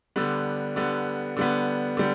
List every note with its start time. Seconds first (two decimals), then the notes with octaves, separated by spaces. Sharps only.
0.16 D3 G3 B3
0.76 D3 G3 B3
1.37 D3 G3 B3
1.97 D3 G3